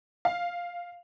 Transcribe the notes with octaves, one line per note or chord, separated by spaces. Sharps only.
F5